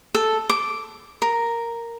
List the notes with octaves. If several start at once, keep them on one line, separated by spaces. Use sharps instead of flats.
A4
D6
A#4